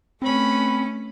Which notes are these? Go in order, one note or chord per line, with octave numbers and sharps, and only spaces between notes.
A3 C4 C#4 B4 B5